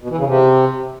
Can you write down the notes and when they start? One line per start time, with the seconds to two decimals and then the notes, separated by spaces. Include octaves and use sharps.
0.02 B2
0.10 E3
0.18 C#3
0.26 C3